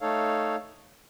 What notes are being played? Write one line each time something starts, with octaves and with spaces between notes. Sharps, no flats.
A3 D#4 A4 C#5 F5